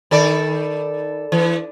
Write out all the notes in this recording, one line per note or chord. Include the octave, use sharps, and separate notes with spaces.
D#3 A4 D5
E3